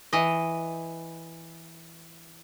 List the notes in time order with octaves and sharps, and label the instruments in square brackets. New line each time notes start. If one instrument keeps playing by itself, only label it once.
[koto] E3 D#5